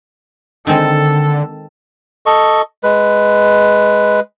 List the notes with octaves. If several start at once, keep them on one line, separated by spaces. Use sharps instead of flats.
D3 D#3 G#3 C4 A4
A4 D#5 C#6
G#3 B4